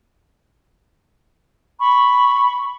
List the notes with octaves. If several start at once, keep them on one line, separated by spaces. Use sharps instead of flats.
B5 C#6